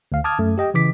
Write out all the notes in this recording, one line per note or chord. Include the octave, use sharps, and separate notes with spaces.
D2 F5
A5 D6 D#6 F6 G#6
F#2 A3
G4 D#5 G5
C#3 E3 D6 B6